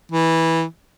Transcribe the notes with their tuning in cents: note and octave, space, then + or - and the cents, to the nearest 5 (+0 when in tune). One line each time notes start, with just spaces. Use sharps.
E3 -10